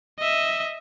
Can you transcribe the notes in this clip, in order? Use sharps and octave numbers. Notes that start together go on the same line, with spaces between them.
D#5 E5